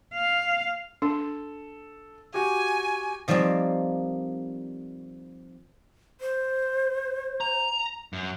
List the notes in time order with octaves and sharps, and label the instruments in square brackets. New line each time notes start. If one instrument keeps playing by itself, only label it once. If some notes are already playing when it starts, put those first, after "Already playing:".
[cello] F5
[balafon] D4 [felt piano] A4
[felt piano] F#4 G4 [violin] G#5
[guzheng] D#3 F3 G3 A#3 C4
[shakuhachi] C5
[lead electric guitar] A#5
F#2